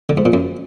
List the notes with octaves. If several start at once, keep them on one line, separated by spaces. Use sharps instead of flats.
D3
G#2
A#2
F#2